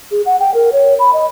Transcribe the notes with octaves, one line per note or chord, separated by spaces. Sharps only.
G#4
F#5
G5
A#4
C#5
B5
D#5